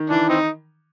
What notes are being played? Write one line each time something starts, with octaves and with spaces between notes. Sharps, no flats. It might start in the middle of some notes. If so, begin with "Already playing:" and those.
Already playing: D#3
E3 D4
C4 D#4